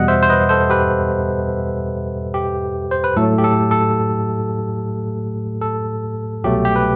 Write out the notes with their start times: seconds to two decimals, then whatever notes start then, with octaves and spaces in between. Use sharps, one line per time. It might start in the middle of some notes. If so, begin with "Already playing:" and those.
Already playing: E2 B2 G3 D#5 F#5
0.08 C5 E5
0.23 C5
0.30 B4 D#5
0.49 A4 C5
0.70 G4 B4
2.34 G4
2.91 C5
3.04 B4
3.16 A2 F#3 A3 A4
3.38 G4
3.44 A4
3.71 A4
5.62 A4
6.44 C2 B2 F#3 A3 G4
6.65 G4
6.76 B4